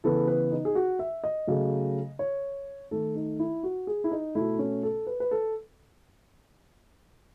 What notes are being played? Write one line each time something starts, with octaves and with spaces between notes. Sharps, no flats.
C#3 E3 B3 A4
B4
D#4
G#4
F#4
E5
D#5
C#3 F#3 A3
C#5
D#3 A3 A4
D#4
E4
F#4
G#4
E4
D#4
B2 A3 E4
C#4
A4
B4
B4
A4